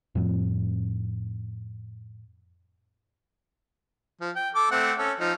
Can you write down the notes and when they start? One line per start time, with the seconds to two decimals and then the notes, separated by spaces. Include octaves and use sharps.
0.15 F2 A2 F3 C4
4.21 F3
4.36 G5
4.55 A4 D6
4.71 A3 C4 F#5
4.98 C#4 A4
5.20 F3 D#4